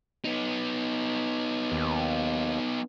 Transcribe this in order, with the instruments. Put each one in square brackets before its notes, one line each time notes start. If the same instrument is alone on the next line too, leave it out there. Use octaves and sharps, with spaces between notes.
[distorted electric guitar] B3 D#4
[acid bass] D#2